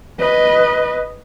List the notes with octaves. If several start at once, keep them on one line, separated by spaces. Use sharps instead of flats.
B4 D#5